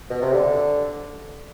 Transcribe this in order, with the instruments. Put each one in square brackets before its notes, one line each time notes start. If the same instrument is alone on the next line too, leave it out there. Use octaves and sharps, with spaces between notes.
[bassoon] B2
C3
D3